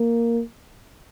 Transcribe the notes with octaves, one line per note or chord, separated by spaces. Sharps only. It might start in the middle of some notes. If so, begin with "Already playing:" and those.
Already playing: A#3